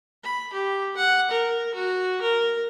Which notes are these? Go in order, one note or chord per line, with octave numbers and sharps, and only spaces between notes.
B5
G4
F#5
A#4
F#4
A#4